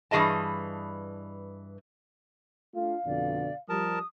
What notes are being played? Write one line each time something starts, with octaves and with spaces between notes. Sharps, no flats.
G2 E3 F3 G#4 D#5 A5
A3 D4 F4 F5
F2 B2 D3 D5
F3 G3 A#4 A5 D#6